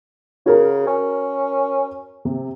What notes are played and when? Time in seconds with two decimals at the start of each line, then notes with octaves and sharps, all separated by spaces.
0.46 C#3 F#4 A#4
0.87 C#4
2.25 C3